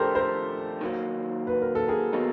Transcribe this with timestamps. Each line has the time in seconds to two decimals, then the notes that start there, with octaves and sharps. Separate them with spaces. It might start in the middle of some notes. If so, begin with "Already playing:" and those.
Already playing: F3 A3 D4 F4 G4 A4 A#4 C5
0.15 A#4 C5
0.81 D#3 F#3 A#3
1.47 B4
1.62 A#4
1.75 A4
1.88 G#4 A#4
2.13 B2 F#3 A#3 D#4